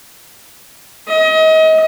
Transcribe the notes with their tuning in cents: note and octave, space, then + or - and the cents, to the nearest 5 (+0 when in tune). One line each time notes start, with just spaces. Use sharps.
D#5 +30